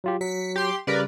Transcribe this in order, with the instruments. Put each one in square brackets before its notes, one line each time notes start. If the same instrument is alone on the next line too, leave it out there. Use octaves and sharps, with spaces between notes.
[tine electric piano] F#3 F4 G4
[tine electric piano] F#3 [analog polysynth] B6 C#7
[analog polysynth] G4 C6
[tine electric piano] C#3 G3 [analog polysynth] A#4 B4 D5